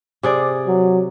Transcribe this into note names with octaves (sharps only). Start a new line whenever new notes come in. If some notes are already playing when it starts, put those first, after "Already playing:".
C3 G#4 D5
F#3